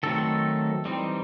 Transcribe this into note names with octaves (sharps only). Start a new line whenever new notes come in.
D#3 F#3 A3 C4 D#4 A4
E3 G3 C4 D#4